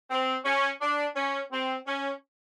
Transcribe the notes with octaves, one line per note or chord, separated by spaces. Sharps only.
C4
C#4
D4
C#4
C4
C#4